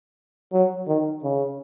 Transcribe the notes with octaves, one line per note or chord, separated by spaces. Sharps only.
F#3
D#3
C#3